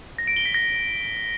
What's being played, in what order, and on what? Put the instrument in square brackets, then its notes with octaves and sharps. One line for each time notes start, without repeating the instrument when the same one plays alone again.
[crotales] A#6
D7
G7
B6
A#6